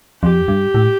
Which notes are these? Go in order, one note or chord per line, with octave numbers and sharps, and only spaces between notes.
F2 G4
G2
A2